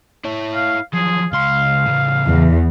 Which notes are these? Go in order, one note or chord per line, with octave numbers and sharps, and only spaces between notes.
E4 C#5
F5
F3 F#3 G#4
C#2 F5 C6
A2 C#3
E2